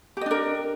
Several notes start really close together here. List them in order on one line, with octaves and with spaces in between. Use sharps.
G4 D#5 D4 A#4